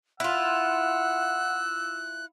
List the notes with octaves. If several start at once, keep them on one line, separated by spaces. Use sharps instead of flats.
E4 F4 F#5 E6 F#6